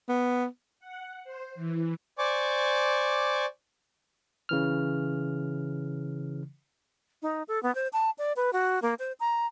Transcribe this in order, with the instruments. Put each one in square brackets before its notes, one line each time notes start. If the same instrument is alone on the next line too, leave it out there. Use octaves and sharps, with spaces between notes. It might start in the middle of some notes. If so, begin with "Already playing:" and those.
[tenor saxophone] B3
[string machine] F#5
C5
E3
[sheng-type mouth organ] C5 D5 G#5 C#6 D6
[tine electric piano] C#3 E3 F6
[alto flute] D#4
A4
B3
C5
A5
D5
B4
F#4
A#3
C5
A#5